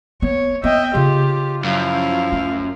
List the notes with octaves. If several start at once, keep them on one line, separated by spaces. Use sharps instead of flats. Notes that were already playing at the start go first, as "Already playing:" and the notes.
B3 C#5
B3 D#5 E5 G5
C#3 F4 G4
F#2 F3 E4 F5
A3